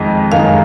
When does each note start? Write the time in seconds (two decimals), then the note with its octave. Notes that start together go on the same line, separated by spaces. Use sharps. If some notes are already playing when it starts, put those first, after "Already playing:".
Already playing: F2 D#3 G#3 C4 D#4
0.32 F#2 D#3 G#3 F5